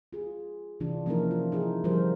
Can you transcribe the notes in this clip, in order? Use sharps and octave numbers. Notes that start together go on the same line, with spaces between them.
F4 G#4
C3 E3 D4 F4
F3 A#3 C#4 D#4 E4 A#4
F4
D#4 E4 G#4
D3 F3 G3 E4 A#4 C5